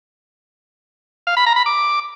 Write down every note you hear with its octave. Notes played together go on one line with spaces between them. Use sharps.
F5
B5
A#5
B5
D6